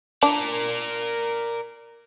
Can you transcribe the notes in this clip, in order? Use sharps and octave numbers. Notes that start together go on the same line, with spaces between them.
D4 A#4 D5